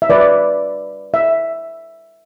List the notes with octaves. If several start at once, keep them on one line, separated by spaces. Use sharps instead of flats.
E5
G3 D4 F#4 B4 D5
E5